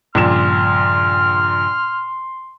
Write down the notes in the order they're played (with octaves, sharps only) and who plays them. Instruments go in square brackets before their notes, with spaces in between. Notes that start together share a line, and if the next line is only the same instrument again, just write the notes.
[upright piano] A#1 A#2 E7 [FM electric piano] G2 C#3 F3 [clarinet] C6 [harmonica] F6